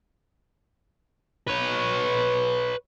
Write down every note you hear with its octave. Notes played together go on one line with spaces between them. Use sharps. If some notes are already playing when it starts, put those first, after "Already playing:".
B4 C#5